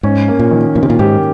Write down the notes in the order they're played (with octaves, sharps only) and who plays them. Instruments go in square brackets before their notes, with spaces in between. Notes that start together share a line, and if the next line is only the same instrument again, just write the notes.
[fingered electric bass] G#2 [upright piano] C#4
[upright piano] A#3
[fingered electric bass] A#2
[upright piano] D#3
[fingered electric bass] A#2 [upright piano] D#3
[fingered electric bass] C3
A#2
[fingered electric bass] G#2 [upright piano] G4